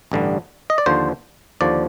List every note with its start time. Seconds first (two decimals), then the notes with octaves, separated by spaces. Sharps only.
0.12 A1 G2 D3 G3
0.70 D#5
0.78 D5
0.86 D#2 D3 F3 C5
1.61 D#2 D3 F3 D5